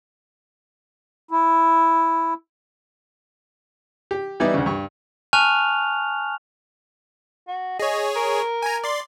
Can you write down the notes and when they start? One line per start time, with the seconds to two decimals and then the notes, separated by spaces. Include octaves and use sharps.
1.31 E4
4.11 G4
4.40 E3 G3 B3 D#4 E4 D5
4.54 D2 C#3
4.66 G2 C#6
5.33 G#5 A5 C#6 F6 F#6 F7
7.48 F#4
7.80 G#4 C#5 D#5
8.16 A#4
8.62 G#5 A#5
8.84 D5 C6